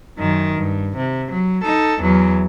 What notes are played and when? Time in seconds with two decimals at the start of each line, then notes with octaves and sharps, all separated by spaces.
0.18 F#2 D#3
0.57 G2
0.97 C3
1.32 F#3
1.64 D#4 A4
2.01 E2 F#3